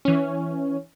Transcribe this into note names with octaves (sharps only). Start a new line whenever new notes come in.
E3 C#4